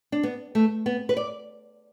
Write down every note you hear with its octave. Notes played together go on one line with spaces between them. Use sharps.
D4
B3
A3
B3
B4
D5